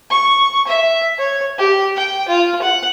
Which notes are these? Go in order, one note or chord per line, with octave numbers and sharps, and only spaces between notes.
C#6
E5
C#5
G4
G5
F4
F#5